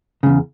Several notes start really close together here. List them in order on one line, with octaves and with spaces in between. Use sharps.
C#3 G2 E2